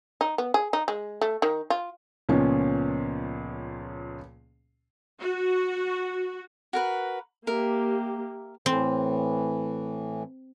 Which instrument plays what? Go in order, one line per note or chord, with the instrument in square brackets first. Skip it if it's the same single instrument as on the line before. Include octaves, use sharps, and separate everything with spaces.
[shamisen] D#4
B3
G#4
D#4
G#3
A3
D#3
F4
[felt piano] C#2 A#2 F3 B3 C#4
[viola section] F#4
[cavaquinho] F#4 A#4 B4
[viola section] A#3 G4 [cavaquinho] A#4 E5
[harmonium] A2 E3 [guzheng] C4